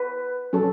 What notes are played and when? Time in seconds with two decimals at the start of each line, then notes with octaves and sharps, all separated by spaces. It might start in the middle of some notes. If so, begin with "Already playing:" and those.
Already playing: B4
0.53 F#3 C#4 A4